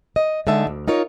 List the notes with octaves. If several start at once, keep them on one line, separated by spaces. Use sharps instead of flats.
D#5
D3 G#3 D#4 E5 A5
D2
D#4 F4 A#4 C#5